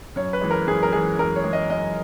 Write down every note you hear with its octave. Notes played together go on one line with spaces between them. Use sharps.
F#2 C#5
B4
E3 G#3
A#4
F#2 G#4
A#4
E3 G#3 G#4
F#2 A#4
C#5
E3 G#3
D#5
F#2 D#5